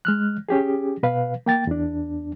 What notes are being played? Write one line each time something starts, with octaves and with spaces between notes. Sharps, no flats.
G#3 F6 F#6
C#4 G4 G#4
B2 B4 F5
A#3 G5 A6
E2 D4